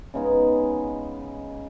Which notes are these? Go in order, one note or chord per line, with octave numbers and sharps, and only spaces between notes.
C#3 G#3 B3 D#4